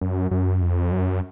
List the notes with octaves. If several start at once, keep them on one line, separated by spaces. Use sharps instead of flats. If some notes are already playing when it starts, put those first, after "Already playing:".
F#2
F#2
F2
F#2